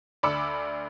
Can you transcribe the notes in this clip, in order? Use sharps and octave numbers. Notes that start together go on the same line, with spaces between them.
D2 D4 B5 D6 E6 C#7